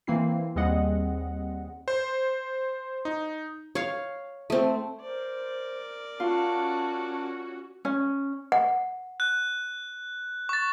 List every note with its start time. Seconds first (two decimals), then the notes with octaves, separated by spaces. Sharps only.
0.07 E3 A#3 C4 E4 C7
0.56 D#2 G3 C4 G#4 D#5 F#5
1.88 C5
3.05 D#4
3.75 C#5 F5
4.50 A3 C4
5.01 A#4 C5 D5
6.20 C#4 F4 F#4 A5
7.85 C#4
8.52 F#5
9.20 F#6
10.49 C#6 A6